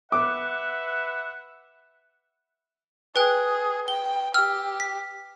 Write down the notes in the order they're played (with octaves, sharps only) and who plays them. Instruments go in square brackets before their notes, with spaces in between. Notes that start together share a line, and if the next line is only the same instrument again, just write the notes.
[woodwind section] B4 E5 F#5 [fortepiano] D6
[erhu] G#4 [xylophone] B4 G5 F#6
[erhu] G5 [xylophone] G7
[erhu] G4 [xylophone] E6 F6
[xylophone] B6